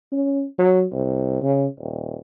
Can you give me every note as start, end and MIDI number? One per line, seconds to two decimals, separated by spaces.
0.12 0.44 61
0.59 0.85 54
0.93 1.40 36
1.42 1.67 49
1.79 2.17 27